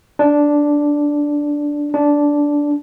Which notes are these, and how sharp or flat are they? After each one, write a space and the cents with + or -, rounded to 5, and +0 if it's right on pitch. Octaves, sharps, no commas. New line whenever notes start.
D4 -5
D4 -10